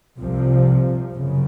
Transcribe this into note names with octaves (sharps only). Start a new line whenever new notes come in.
C2 C3 F3
F#1 F#2 C#3